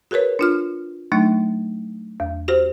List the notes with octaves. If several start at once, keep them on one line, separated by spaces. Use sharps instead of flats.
F#4 G#4 A#4 B4 C#5
D4 F4 F6
F#3 A3 D4 D#4
E2
F#4 G4 C5